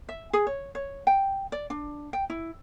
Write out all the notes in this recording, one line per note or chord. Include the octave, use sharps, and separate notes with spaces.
E5
G#4
C#5
C#5
G5
D5
D4
G5
E4